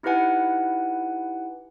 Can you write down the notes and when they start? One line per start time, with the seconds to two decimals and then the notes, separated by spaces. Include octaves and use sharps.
0.03 D#4 E4 G4 B4 F#5 G#5